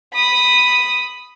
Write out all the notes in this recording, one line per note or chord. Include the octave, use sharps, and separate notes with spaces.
B5 D#6